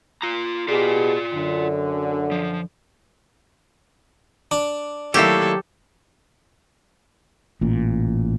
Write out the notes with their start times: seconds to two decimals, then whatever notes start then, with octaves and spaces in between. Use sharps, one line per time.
0.22 F4 A#5
0.68 B2 F4 G4 G#4 D5
1.33 F#2 D3
2.32 F3
4.51 D4
5.14 D#3 F#3 A3 A#3 E4 G4 A4
7.61 A1 A#2